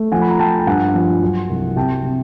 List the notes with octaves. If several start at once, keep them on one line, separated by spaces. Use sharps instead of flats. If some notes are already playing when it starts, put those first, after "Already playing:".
Already playing: A3
F3 F#5 G#5
B5
A#5
F3 G5 A5
G5
G2 F#5 G#5
F3
F#3
C2
C3 G5 A5
C3